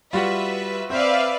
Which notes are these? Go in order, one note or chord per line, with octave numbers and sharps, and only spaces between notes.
G3 F4 F#4 B4 E5 F#5
C4 B4 C5 D5 E5 F5